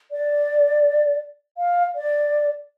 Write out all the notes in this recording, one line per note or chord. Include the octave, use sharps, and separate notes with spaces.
D5
F5
D5